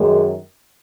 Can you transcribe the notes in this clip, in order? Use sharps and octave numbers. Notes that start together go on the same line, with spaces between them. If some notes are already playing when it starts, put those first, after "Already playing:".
Already playing: F#2 D#3 G#3